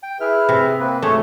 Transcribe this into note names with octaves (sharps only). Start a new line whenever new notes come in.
G5
E4 G#4 B4 E5 F6
C3
A#3 C4 B4
D2 A3 G#4 C#5